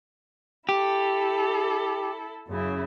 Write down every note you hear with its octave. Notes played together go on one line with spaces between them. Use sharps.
E4 G4 A4
F#2 C#3 E4